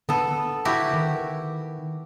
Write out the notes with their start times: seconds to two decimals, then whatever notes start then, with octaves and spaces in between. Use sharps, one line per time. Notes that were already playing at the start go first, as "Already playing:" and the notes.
0.09 D3 B3 A4
0.65 E4 F#4 G4
0.94 D#3